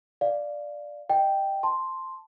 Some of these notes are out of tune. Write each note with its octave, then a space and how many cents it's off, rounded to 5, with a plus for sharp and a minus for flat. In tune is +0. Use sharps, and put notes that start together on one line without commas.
D5 +0 F5 +0
D#5 -15 G5 -5
A5 +0 C6 +0